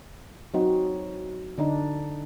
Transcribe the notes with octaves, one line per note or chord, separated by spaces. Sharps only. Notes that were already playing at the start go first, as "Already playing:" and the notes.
F#3 C4 D#4 F#4
D3 D4 D#4